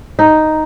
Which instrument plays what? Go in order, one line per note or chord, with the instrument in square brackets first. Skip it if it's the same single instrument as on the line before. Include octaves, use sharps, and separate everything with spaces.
[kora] D#4